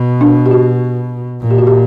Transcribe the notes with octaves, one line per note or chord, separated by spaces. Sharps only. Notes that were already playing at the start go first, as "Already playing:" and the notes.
Already playing: B2
D4
G4
F#4
A#2
G4
F#4
G4